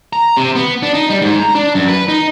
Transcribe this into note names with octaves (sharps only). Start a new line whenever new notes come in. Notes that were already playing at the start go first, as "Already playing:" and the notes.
A#5
C3
B3
D4
D#4
G3
G#2
A#5
D4
F#2
B4
D#4